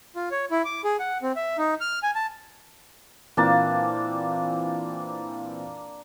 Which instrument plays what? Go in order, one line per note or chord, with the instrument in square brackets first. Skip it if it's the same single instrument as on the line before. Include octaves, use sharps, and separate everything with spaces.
[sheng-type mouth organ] F4
C#5
E4
D6
G#4
F#5
C4
E5
D#4
F6
G#5
A5
[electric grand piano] A#2 E3 C4 [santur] A#3 D4 A5